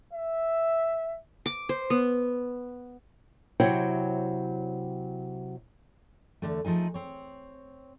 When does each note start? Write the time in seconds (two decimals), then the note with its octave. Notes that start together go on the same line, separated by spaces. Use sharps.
0.14 E5
1.46 D6
1.69 C5
1.90 B3
3.60 C3 F#3 E4 C5 C#5 G5
6.42 E2 G2 D3 A3
6.65 F3 A3 D#4 G#4
6.94 C4 C#5